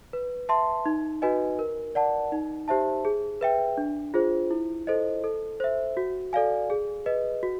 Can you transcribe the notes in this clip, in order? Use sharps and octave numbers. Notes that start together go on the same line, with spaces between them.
B4
E5 A5 C6
D#4
F#4 B4 D#5 G#5
A#4
D5 F#5 A5
D#4
G4 C5 E5 A5
G#4
B4 E5 G5
D4
F4 G#4 C5
E4
A4 C5 D#5
A4
C5 E5
F#4
A4 D5 F5 G#5
G#4
B4 D#5
F#4